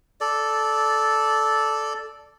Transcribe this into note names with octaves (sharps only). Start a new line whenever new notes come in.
A4 D5